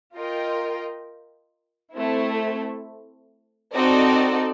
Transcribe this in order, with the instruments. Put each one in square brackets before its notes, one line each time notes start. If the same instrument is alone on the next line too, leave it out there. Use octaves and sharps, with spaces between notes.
[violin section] F4 A#4 D#5 G5
A3 C4 E4
C4 D#4 F#4 A4 D5